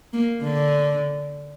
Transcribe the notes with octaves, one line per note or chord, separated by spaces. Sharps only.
A#3
D3